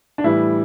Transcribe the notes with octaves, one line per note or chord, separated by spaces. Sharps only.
D4
A2 E3 G3 E4